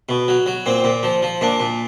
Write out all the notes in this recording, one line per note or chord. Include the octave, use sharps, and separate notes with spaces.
B2
F#3
F#3
A#2 C4
A#2
F3
F3
A#2 D4
A#2